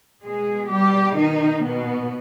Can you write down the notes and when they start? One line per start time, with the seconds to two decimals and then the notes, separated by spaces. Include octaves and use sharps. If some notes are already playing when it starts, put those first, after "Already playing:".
0.22 B2 G#3 G#4
0.69 G3 G4
1.17 B2 D#3 D#4
1.64 B2 B3